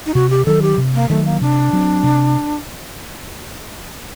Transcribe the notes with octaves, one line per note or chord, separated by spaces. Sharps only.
D#4
C3 F#4
G4
D#3 F#3 A4
G4
C3
A#3
D#3 F#3 A3
A#3
C3 D4
F#3 C4
C3